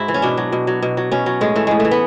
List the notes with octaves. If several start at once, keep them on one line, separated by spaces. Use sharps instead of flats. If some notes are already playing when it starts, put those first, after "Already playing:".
Already playing: G#2 E4 F#4
E3
C#4
B2 D4
F#3
B2
F#3
B2
F#3
B2 C#4
F#3
A2 G#3
E3 A3
A2 G#3
A3
E3
B3